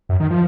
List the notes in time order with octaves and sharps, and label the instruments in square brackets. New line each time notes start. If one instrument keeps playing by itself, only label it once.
[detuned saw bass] F#2
D#3
F3